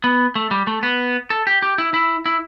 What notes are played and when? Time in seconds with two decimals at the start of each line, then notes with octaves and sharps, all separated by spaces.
0.04 B3
0.35 A3
0.51 G3
0.67 A3
0.83 B3
1.30 A4
1.47 G4
1.62 G4
1.78 E4
1.94 E4
2.26 E4